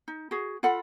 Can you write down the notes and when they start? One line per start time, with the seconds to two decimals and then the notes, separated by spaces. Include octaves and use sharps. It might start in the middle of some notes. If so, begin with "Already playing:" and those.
0.08 D#4
0.31 F#4 G#4
0.63 F4 A4 F#5 B5